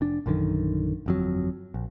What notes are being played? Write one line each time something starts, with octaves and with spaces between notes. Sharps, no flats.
F1 D4
A#1 F#2 D3 D#3
G1 F2 F#3
A#1